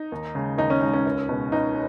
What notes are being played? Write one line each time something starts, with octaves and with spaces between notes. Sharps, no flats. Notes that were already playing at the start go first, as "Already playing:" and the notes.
Already playing: D#4
D#2
C#3 G#3
D#2 D#4
C#4
C#3 G#3 D#4
C#4
C#2
B2 G#3
C#2 D#4